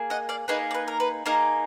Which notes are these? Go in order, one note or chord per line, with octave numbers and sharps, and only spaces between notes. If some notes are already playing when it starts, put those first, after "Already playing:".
Already playing: A#3 G#4
D#5 F#5
D5 F5
A#3 D#4 G#4 B4 D#5
D5
B4
A#4
B4
A#3 D#4 G#4 A#4